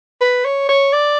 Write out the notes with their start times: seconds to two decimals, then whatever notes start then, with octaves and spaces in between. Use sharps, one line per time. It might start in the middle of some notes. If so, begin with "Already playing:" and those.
0.21 B4
0.45 C#5
0.69 C#5
0.93 D5